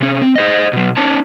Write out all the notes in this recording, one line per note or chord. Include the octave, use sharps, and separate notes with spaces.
C3 C#4
C4
G#4 C5 D#5
B2 F#3
C#4 D#4 C#5 A5